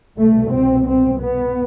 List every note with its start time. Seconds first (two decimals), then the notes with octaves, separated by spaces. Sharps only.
0.19 C2 B2 A3
0.52 C4
0.87 C4
1.21 B3